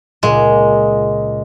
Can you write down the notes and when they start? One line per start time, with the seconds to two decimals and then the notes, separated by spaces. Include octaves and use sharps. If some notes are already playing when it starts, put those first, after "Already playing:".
0.23 C#2 A#2 G#3